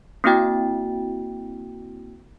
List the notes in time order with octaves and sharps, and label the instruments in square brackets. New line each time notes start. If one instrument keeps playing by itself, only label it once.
[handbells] A#3 C4 E4 F#4 G5 A6